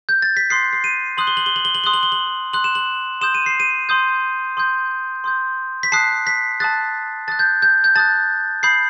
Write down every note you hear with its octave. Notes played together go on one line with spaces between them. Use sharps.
G6
A6
B6
C6 D#6 F#6 C7
C7
D#7
C6 D#6 F#6 F#7
G7
F#7
G7
F#7
G7
F#7
C6 D#6 F#6 G7
F#7
G7
F#7
C6 D#6 F#6 F#7
E7
F#7
C6 D#6 G6 E7
D#7
C7
D#7
C6 D#6 G6
C6 D#6 G6
C6 D#6 G6
B6
A5 D#6 F#6 C7
B6
A5 D#6 F#6 A6
A5 D#6 F#6 A6
G6
G6
G6
A5 D#6 F#6 A6
B5 D#6 G6 C7